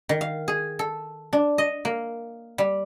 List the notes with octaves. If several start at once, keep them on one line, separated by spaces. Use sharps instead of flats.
D#3
F5
G#4
A4
D4
D#5
A#3
G3